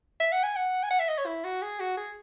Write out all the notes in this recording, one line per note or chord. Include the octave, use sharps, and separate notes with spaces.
E5
F#5
G#5
F#5
G#5
F#5
E5
D#5
C#5
E4
F#4
G#4
F#4
G#4